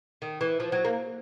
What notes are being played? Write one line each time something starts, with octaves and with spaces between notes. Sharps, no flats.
D#3
E3
F3
F#3
A#3